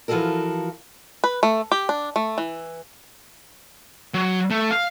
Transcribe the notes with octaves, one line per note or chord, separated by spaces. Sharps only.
E3 F3 F4 F#4 A4 A#4
B4
A3
G4
D4
A3
E3
F#3
A3
F5